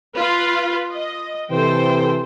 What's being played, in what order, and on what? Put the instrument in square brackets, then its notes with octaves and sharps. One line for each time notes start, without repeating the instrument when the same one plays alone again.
[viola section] F4 B4
D#5
[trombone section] C3 E3 [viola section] A4 C5 G5